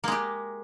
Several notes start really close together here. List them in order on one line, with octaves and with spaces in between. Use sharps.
A#3 G#3 G4